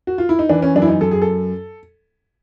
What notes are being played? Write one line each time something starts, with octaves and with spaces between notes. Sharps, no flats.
F#4
F4
E4
D#4
E3 D4
C#4
F#2 D4
E4
D#4
F#2 A4
G#4
A4